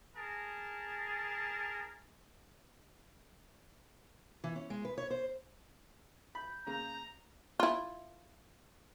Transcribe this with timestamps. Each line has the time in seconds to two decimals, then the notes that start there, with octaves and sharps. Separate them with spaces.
0.16 G#4 A#4 A5
4.44 E3
4.56 C#4
4.70 G#3
4.85 B4
4.98 C#5
5.10 C5
6.35 B5 G6
6.67 C#3 A#3 A#5
7.60 E4 F4